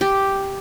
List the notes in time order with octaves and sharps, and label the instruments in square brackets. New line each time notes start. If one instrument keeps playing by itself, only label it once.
[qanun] G4